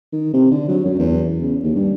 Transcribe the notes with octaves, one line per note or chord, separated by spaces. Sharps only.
D#3
C3
D3
F#3
F#2
E2
C#3
D#2
G2